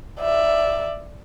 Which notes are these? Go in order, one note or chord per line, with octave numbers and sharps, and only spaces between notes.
D5 E5